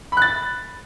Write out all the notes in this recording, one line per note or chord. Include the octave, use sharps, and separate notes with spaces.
B5 F#6 A6